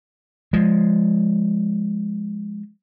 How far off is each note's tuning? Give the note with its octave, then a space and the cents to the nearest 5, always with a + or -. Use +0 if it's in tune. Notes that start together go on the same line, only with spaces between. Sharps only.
F3 +0 G#3 +0